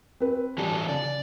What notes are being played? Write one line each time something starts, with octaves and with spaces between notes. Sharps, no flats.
C4 B4
E3 F#3 G3 A4
C#3 D5